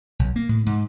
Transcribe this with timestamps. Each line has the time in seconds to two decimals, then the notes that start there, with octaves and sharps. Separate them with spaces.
0.19 B1
0.36 A#3
0.49 A2
0.66 G#2